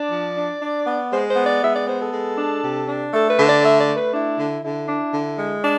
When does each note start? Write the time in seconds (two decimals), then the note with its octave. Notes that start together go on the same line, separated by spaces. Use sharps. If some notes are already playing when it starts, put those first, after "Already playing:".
Already playing: D4 D5
0.10 F3
0.35 D4
0.60 D4
0.86 B3
1.10 G#3 C5
1.28 C5
1.36 B3
1.44 D5
1.61 G#3 E5
1.74 D5
1.86 B3 C5
1.99 A4
2.11 G#3
2.36 D4
2.61 C3
2.86 D4
3.12 A3 A4
3.29 B4
3.37 D3
3.46 D5
3.62 A3 E5
3.78 D5
3.87 A3
3.95 B4
4.12 D4 E4
4.38 D3
4.62 D3 E4
4.88 D4
5.12 D3
5.38 G#3
5.63 D4